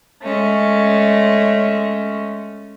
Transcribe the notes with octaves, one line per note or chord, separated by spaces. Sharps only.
G#3 A3 C#4